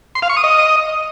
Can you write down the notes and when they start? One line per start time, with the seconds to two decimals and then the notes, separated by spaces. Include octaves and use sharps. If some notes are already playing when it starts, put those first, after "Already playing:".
0.15 C6
0.22 F5
0.30 C#6
0.37 D#6
0.44 D#5